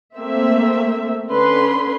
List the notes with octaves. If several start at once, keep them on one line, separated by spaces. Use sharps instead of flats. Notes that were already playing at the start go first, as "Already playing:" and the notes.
A3 A#3 C4 E5
D3 C#4 B4 C6